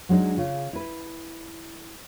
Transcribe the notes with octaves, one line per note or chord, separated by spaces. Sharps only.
F#3 G#3 D4 D#4
C#3 F4
E4 B4